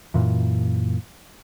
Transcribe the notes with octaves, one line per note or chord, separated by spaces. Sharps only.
F#2 A#2 E3